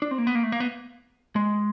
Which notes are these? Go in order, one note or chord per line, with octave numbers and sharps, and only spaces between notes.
D4
C4
A#3
B3
A#3
A3
A#3
B3
G#3